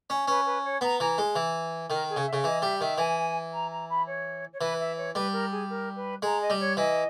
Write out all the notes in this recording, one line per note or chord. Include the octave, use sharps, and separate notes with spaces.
C#4
C#4 B4
B4
C#5
B3 A#5
E3 A#5
G#3
E3
D#3 A#4
G#4
C#3
E5
C#3
E3 D#5
G3 E5
D#3 E5
E3 G#5
A#5
A#5
B5
C#5
C#5
E3 B4
E5
C#5
G3 B4
A#4
G#4
A#4
B4
G#3 A#5
D#5
G3
C#5
E3 D#5